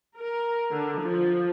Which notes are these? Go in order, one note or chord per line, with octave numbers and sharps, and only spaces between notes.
A#4
D3
F3